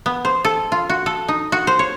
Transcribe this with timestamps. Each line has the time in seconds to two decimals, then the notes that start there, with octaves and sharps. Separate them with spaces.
0.06 B3
0.25 C5
0.45 A4
0.72 F4
0.90 F#4
1.06 A4
1.28 D#4
1.52 F#4
1.67 C5
1.79 C#5